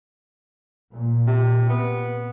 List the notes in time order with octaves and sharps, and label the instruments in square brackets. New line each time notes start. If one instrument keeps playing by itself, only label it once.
[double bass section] A#2
[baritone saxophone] C3
B3